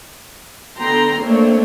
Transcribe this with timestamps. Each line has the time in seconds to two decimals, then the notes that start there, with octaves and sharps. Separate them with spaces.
0.78 D3 B3 A4 G5 A#5 C6
1.20 A3 A#3 C4 D4 C#5